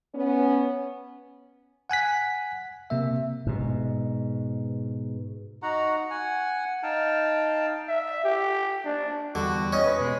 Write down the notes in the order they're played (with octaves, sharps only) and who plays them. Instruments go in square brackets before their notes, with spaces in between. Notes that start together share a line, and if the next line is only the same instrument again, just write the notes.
[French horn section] B3 C#4
[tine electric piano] F#5 G#5 F#6 B6
C3 A#3 E5
[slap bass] G#2 B2
[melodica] D#4 F#4 F#5 A#5
F#5 G#5
D#4 F5 G5 A5
[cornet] E5
G4
D4
[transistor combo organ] E2 G3 [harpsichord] D3 [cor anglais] F#4
[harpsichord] C#4 [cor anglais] D#5
[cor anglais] B4
[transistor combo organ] B2 [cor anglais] G#3